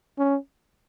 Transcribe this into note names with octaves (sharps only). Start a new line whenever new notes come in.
C#4